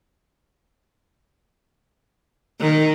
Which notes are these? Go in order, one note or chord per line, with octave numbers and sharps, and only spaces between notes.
D#3